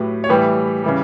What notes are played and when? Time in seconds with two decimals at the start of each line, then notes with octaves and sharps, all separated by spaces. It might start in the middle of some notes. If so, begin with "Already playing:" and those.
Already playing: A2 F#3 G4 B4
0.24 C#5
0.29 A2 E3 G3 G4 B4
0.84 C#3 E3 G3